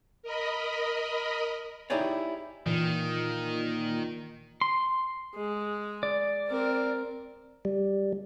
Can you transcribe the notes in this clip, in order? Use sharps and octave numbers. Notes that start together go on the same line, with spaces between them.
A#4 D#5 B5
D#4 E4 G4 G#4 C#5 D5
A#2 D#3 E3
C6
G#3
D5
C4 A#4
G3